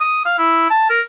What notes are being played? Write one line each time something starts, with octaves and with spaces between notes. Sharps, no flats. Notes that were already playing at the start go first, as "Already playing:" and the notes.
D#6
F5
E4
A5
A#4